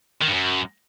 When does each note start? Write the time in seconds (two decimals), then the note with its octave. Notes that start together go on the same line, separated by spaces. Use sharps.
0.22 D#3
0.28 G2
0.33 F#2